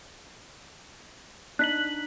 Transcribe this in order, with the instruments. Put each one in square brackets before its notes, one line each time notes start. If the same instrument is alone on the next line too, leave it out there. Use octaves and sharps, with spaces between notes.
[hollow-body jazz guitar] D4 D#4 [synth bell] F#6 B6 F#7